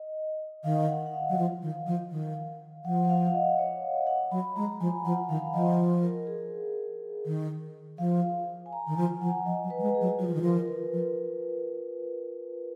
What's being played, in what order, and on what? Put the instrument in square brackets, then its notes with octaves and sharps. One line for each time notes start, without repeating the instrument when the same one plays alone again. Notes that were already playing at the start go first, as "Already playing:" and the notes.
Already playing: [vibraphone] D#5
[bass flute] D#3 [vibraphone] F5
[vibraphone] F#5
F#5
F5
[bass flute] F#3
F3
D#3
F3
D#3
[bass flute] F3 [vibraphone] F#5
[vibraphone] F#5
F5
F5
D#5
C#5
F#5
[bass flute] F#3 [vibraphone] B5
[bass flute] G#3 [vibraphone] A#5
[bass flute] F3 [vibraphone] G#5
[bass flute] F3 [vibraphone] F#5
[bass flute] D#3 [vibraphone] F5
[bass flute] F3 [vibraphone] D#5
[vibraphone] A#4
G#4
[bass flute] D#3
[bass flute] F3 [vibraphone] F5
[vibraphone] G#5
A#5
[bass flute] D#3
[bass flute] F3 [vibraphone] G#5
[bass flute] F3 [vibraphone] F#5
[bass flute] F3 [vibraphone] D#5
[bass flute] F#3
[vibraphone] B4
[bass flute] F#3
G#3
[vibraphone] G#4
[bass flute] F#3
[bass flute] F#3 [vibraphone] F4
[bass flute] F3
D#3
[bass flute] F3 [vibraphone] A#4
[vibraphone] B4
[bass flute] F3